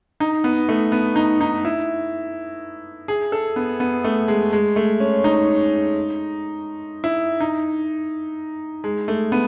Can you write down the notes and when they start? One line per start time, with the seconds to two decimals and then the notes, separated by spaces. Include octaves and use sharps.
0.20 D#4
0.44 B3
0.69 A3
0.92 B3
1.16 D#4
1.41 D#4
1.65 E4
3.08 G#4
3.32 A4
3.56 B3
3.80 B3
4.04 A3
4.28 G#3
4.53 G#3
4.76 A3
5.00 C#4
5.24 D#4
7.04 E4
7.40 D#4
8.84 G#3
9.08 A3
9.32 B3